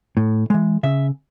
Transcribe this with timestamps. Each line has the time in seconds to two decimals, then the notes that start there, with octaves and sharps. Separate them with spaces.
0.17 A2
0.50 E3 G#3
0.83 C#3 E5